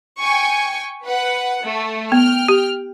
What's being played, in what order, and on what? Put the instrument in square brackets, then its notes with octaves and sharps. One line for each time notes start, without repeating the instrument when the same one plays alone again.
[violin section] G5 G#5 C#6
B4 F#5
A3
[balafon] B3 [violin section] G5 F6
[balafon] G4